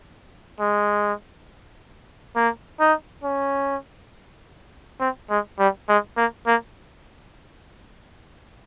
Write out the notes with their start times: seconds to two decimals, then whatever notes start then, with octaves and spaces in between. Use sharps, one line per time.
0.60 G#3
2.35 A#3
2.80 D#4
3.23 C#4
5.00 C4
5.30 G#3
5.59 G3
5.89 G#3
6.17 A#3
6.47 A#3